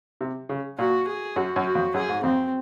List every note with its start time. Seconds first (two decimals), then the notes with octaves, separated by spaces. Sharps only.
0.21 C3
0.49 C#3
0.79 A#2 F#4
1.07 G#4
1.36 F#2 F#4
1.56 F#2
1.66 F#4
1.75 F2
1.94 F#2 G#4
2.09 G#2
2.23 F2 C4